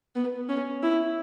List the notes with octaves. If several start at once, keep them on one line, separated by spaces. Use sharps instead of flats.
B3
C#4
E4